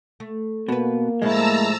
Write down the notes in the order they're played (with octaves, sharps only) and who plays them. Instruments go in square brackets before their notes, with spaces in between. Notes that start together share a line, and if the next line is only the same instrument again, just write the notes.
[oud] A3
[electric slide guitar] B2 [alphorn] A#3 [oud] F#4 B4
[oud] A2 F3 A3 [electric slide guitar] G#3 E4 [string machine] A5 A#5 E6